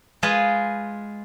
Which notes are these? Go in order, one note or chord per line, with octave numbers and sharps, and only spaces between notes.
G#3 F4 G#4 B4